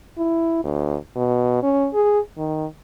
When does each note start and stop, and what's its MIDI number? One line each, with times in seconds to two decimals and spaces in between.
0.18 0.59 64
0.64 0.96 38
1.16 1.62 47
1.63 1.88 61
1.94 2.20 68
2.37 2.66 51